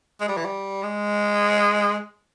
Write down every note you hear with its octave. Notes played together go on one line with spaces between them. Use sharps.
G#3
G3
E3
G3
G#3